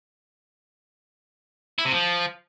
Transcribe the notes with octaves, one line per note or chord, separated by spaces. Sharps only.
E4
C3
F3